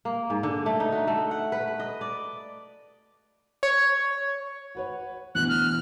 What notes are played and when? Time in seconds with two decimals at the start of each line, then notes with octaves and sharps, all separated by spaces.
0.05 A#3
0.30 G#2
0.43 D3
0.66 A3
0.80 D#4
0.92 F#4
1.07 A3
1.31 F#5
1.52 B4
1.67 B4
1.80 D#5
2.01 D5
3.63 C#5
4.75 F#4 B4 C#5
5.35 D2 B2 E3 F#6
5.49 F6